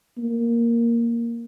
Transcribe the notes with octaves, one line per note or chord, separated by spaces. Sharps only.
A#3